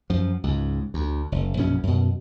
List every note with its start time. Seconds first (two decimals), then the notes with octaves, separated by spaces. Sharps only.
0.10 F#2 F3
0.44 C#2 G#2
0.94 D2
1.32 F#1
1.57 A#1 F#2 B2 C#4
1.83 F#2 B2